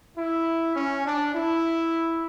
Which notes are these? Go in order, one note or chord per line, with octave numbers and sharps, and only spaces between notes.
E4
C#4
D4
E4